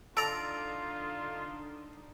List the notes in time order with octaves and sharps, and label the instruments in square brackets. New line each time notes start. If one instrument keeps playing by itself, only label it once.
[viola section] D3 D4 D#4 [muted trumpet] F4 [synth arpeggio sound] A4 [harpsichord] D5 A#5